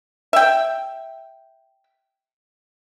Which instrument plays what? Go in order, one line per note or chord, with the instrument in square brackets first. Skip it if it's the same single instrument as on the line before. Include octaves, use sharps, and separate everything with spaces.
[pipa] E5 G5